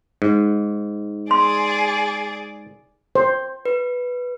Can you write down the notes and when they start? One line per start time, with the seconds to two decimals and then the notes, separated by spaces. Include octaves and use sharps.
0.22 G#2
1.31 G#4 D5 C6
3.15 C5
3.65 B4